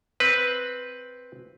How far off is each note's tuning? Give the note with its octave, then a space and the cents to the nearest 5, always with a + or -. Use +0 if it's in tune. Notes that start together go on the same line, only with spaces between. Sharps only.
C4 +0 B4 +0